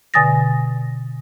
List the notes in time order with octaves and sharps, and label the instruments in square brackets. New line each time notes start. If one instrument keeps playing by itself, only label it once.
[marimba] B2 D3 G#5 D#6 A6 A#6